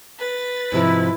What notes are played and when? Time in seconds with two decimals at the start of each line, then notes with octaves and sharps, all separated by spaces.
0.17 B4 A6
0.72 G#2 C3 F3 E4